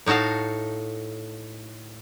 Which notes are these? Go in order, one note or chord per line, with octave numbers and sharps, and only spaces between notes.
A2 D#4 F#4 A4 F5